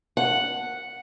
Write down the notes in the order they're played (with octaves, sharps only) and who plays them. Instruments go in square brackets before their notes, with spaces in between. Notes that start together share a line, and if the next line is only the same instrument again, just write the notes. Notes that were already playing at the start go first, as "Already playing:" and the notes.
[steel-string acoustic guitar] F#5